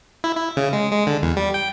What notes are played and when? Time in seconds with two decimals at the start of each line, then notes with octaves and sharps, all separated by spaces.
0.24 E4
0.36 E4
0.57 C#3
0.73 G#3
0.92 G#3
1.07 D3
1.22 E2
1.37 G3
1.54 G5